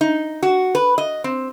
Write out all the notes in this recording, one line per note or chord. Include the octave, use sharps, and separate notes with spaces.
D#4
F#4
B4
D#5
C4